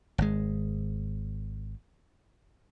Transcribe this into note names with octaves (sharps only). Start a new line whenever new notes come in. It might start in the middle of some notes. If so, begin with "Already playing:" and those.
G#1 G#3